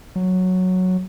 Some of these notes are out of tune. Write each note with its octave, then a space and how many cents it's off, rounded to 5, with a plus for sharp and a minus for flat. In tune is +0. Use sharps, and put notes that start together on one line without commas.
F#3 -5